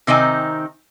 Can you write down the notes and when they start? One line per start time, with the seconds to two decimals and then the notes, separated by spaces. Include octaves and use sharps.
0.07 C3 D#3 C4 D#4 G#5